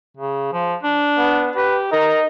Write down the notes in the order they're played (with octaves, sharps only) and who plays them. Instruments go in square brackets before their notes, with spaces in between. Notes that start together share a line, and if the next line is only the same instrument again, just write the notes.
[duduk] C#3
F3
D4
[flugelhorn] B3
[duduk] G4 [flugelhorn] B4
[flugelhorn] D#4 [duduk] A#4